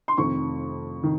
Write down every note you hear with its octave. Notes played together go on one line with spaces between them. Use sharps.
C6
F1 F2 D#3 C#6
D#3